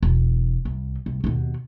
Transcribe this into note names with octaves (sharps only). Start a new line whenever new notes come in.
E1
C2
C2
D#2 B2